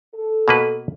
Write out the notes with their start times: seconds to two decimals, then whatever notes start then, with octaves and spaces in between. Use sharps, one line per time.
0.14 A4
0.48 B2 A#3 B4